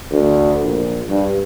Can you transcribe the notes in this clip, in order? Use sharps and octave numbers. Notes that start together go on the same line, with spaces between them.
D2
A#1
G2